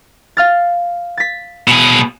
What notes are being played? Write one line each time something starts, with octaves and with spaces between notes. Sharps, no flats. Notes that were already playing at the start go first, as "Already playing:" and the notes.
F5 F6 A6
A6 B6
B2 G#4